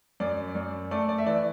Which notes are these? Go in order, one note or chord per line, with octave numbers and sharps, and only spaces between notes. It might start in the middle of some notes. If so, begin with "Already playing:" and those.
F#2 D5
F#2
A3 D5
D5
E5
E3 D5